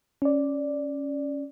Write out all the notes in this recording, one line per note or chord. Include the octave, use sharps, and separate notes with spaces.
C#4 D5